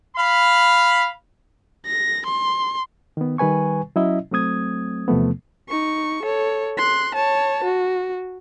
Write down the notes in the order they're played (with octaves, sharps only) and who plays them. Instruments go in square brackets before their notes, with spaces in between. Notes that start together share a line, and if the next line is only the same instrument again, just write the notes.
[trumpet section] F5 B5
[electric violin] A#6
C6
[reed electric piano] D#3 B3
D#3 G3 B4 G#5 C#6
F#3 C#4 E4 D#5 E5
F#3 A3 C4 D#6 G#6
E2 C3 F3 A3 B3
[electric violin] D#4 C#6
A4 C#5
C6 F#6
C#5 A5
F#4